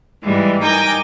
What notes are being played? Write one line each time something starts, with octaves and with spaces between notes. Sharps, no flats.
G#2 E3 G3 G#3
D#4 A#4 G5 G#5 D6 G6